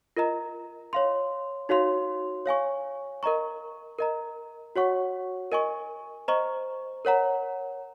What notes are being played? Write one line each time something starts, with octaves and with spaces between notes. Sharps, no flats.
F4 A#4 D#5 A#5
C#5 F5 C6
D#4 F#4 C#5 F5 C6
C#5 F5 G#5 C#6
A#4 D#5 A#5 C#6
A#4 D#5 A#5
F#4 C#5 F#5 C#6
A#4 D#5 G#5 C#6
C5 D#5 A#5 C#6
A#4 C#5 F#5 A#5